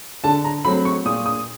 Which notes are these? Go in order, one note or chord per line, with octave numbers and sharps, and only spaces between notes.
D3 A5
A#5
F#3 A3 C4 B5
C#6
A#2 D#6
D#6